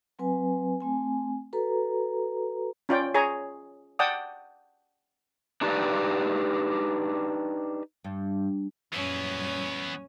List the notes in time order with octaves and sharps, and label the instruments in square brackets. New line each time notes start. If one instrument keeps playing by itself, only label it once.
[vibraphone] F#3 C4 B4 G#5
A3 C4 G#5
F#4 A4 B4 A#5
[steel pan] C#4 F4 D5 G5
G#4 C#5 G#5 A#5
D5 F#5 G5 A5 D6 D#6
[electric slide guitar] D4 D#4 G4 B4 D5
[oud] G2
[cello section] F#2 A#2 G3 [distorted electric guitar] E3 B3 [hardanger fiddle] C#4